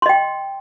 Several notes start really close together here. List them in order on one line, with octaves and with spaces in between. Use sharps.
C6 D#5 G5